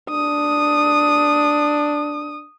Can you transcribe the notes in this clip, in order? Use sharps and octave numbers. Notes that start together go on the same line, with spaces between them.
D4 D#6